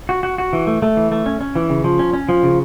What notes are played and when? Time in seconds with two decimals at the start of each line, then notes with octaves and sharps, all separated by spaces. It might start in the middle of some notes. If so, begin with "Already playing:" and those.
0.09 F#4
0.23 F#4
0.38 F#4
0.53 E3
0.67 A3
0.82 A3
0.97 E3
1.12 A3
1.26 C#4
1.41 C#4
1.56 E3
1.70 C#3
1.84 F3
1.99 C#4
2.13 C#4
2.29 F3
2.43 C#3